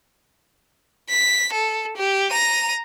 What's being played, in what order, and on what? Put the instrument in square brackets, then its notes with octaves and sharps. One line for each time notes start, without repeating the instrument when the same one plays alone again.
[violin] B6
A4
G4
A#5 D#7